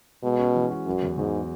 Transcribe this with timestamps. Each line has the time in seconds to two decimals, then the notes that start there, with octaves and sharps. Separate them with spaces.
0.23 B2 G#3
0.39 C#4
0.55 E3
0.70 F#4
0.86 F#2 F#3
1.03 E2
1.17 E2 G#2